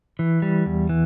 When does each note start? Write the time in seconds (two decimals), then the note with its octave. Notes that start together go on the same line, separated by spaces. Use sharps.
0.19 E3
0.42 G3
0.66 E2
0.89 E3